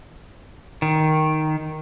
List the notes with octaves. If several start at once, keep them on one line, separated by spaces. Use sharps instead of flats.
D#3